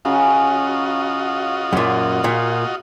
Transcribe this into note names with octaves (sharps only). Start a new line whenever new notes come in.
C#3 F#3 F4 F#4 C#5 D#5
F#2 A#2
A#2